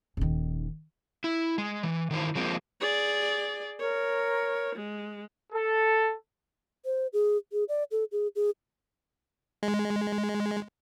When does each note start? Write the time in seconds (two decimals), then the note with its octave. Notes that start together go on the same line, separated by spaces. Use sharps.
0.17 D#1 D#3
1.24 E4
1.58 G#3
1.83 E3
2.11 D#3 E3 C5
2.35 F3 G#3 A#3 C4
2.80 G#4 D5
3.80 A#4 C#5
4.75 G#3
5.53 A4
6.85 C5
7.13 G#4
7.53 G#4
7.69 D5
7.91 A4
8.12 G#4
8.36 G#4
9.63 G#3